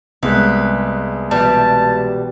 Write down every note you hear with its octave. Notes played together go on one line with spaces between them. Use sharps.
C2 G#3 B3 B4
B2 E3 G3 A5